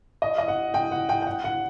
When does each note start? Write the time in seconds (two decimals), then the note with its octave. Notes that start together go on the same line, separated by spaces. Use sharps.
0.22 D#5
0.38 D#5
0.48 F#5
0.74 G5
0.91 F#5
1.09 G5
1.22 G5
1.27 F#5
1.44 F#5